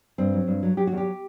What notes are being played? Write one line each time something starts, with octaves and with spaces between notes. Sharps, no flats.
G2 C4
F#3
G2
F#3
F#3 G4
F#4
E2
G4